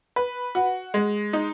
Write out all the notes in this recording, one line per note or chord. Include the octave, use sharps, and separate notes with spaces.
B4
F#4
G#3
D#4